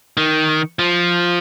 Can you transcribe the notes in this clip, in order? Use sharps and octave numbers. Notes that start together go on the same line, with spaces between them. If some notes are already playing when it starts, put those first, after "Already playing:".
D#3
F3